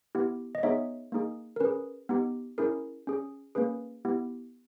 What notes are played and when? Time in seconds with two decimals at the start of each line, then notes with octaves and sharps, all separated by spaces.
0.15 B3 E4 G4
0.55 D#5
0.63 B3 D#4 G#4 C#5 E5
1.12 A#3 D#4 G#4
1.56 A#4
1.60 C#4 G#4 B4
2.09 B3 D#4 G4
2.58 C#4 E4 G#4 A#4
3.07 C#4 G#4
3.55 A#3 C#4 G#4 B4
4.05 B3 E4 G4